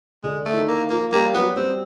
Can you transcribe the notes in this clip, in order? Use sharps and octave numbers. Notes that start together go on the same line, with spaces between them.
D3 G#3 D4
A3
E4
D#3 D#4
A#3
F3 A#3 F4
G3 A#3 G4
F#3 B3 F#4
G3 C4 G4